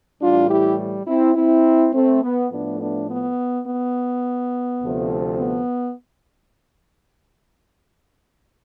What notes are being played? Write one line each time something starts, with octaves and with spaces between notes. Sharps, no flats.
A2 E3 G3 D4 F4
E4 G4
C4 E4
C4 E4
A3 C4
B3
A2 F3 A3 B3 D4
B3 D4
B3
B3
D2 C3 F3 A3
B3